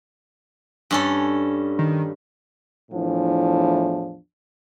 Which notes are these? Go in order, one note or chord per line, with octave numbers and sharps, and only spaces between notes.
G2 C#4 A4
D#3
E2 A2 E3 F3 D4